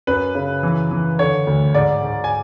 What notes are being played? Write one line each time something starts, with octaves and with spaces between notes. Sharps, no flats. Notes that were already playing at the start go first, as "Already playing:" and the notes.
F#2 B4
C#3
E3
E3
D3 C#5
D2
G#2 D5
G#2
G#5